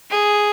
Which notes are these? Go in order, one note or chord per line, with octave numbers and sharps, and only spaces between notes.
G#4